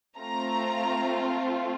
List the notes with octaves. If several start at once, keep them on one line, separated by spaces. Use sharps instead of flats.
A3 C4 F4 A#5